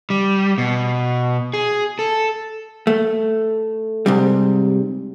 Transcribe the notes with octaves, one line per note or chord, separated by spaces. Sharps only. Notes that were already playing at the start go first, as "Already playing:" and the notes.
G3
B2
G#4
A4
A3
G#2 C3 G3